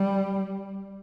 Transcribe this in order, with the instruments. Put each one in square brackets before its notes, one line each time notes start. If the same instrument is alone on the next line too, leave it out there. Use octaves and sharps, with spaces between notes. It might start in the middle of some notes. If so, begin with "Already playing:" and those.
Already playing: [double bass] G3